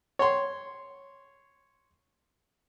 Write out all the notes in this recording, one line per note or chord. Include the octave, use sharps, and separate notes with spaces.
C#5 C6